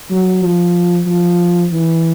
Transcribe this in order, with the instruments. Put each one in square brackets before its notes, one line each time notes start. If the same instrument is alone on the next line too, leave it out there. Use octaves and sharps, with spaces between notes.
[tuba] F#3
F3
F3
E3